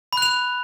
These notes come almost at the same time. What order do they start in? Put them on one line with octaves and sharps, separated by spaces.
B5 F#6 F7